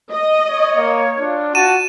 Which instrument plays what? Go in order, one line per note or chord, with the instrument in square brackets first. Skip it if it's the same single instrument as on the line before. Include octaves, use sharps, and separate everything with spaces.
[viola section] D#5
[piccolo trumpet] C#5
[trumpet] A#3
[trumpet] D4 [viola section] F4
[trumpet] F#4 [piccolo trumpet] A5 [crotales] D#7 E7